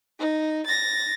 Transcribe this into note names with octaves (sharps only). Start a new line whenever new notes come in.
D#4
A6 A#6